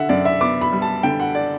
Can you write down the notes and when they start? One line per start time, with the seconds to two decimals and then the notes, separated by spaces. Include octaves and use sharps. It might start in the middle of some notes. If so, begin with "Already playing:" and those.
Already playing: D3 E5 F#5
0.09 F#2 D5
0.25 E5
0.41 B3 D6
0.61 B5
0.72 G3
0.82 A5
1.03 D3 G5
1.20 F#5
1.35 D5